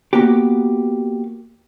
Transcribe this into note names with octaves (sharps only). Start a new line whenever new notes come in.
A#3 B3 F#4 G4